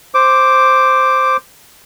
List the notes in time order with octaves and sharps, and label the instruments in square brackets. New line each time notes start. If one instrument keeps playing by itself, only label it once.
[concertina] C5 D6